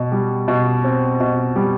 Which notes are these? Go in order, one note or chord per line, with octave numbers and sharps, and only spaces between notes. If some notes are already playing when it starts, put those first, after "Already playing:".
Already playing: B2
G3
B2
C4
B2
G3